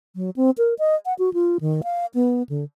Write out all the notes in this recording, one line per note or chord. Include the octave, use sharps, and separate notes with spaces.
F#3
C4
A#4
D#5
F#5
F#4
F4
D#3
F5
B3
D3